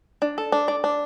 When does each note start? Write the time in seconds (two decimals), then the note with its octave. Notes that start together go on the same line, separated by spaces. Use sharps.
0.22 D4
0.38 A4
0.52 D4
0.68 D5
0.84 D4